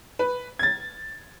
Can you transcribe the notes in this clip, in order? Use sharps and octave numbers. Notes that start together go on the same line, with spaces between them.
B4
G#6 A6